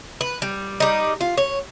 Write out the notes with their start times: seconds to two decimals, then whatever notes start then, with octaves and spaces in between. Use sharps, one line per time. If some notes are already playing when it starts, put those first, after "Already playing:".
0.21 B4
0.42 G3
0.80 G3 D#4
1.21 F4
1.37 C#5